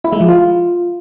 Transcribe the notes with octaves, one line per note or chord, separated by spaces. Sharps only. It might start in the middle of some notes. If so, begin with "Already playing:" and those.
E4
G#3
F3
F4